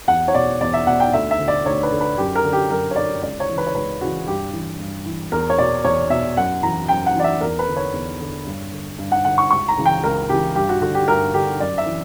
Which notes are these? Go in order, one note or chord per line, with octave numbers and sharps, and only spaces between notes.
E2 F#5
C#5
B2 D5
E2 D5
E5
B2 F#5
G5
D2 E5
E5
D3
D5
D2 C#5
B4
D3
B4
F#2 G4
A#4
D3
G4
F#2 A#4
C#5
D3 D5
C#2 D5
C#5
C#3 E3
B4
C#5
C#2 B4
C#3 E3 F#4
G2 G4
E3
G2
E3
E2 A#4
C#5
B2 D5
E2 C#5
B2 E5
F#2 F#5
E3 A#5
F#2 G5
F#5
E3 D5
E5
E2 A#4
B4
D3
C#5
E2
D3
G2
D3
G2
F#5
D3 F#5
C#6
C#2 C#6
A#5
C#3 E3
G5
C#2 A#4
C#3 E3 G4
G2 G4
F#4
D3 F#4
G4
G2 A#4
D3 G4
F#2 D5
E5
E3